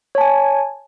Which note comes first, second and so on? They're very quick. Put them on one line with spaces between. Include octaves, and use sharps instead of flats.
C#5 A5 G#5